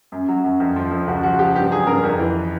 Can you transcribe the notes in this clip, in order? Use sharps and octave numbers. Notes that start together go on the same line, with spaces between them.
F#2
F#3
F#2
F2
F3
F2
C#2 F#4
F3 F#4
C#2 G4
G2 G4
F#3 G#4
G2 A#4
F2
E3